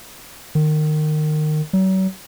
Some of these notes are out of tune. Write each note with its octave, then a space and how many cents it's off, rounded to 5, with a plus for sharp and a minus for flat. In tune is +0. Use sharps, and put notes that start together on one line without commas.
D#3 -25
F#3 +40